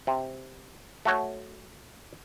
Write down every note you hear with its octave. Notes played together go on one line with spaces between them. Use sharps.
C3
A3 F#4 C#5